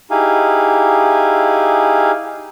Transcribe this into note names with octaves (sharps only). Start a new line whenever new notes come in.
D#4 E4 G4 G#4 F5 G#5